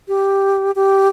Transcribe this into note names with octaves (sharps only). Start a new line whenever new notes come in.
G4
G4